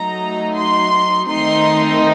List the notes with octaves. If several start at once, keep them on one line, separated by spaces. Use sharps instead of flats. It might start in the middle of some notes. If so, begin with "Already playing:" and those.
Already playing: F#3 A3 D#4 A#5
C6
D#3 A3 C4 D#4 C6